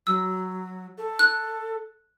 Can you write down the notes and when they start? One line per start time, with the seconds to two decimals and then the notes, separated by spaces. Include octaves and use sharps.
0.07 F#3 E6
0.98 A4
1.19 F#6